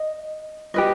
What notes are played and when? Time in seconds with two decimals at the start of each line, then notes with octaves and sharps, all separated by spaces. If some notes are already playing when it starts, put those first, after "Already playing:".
Already playing: D#5
0.74 G4 B4 D#5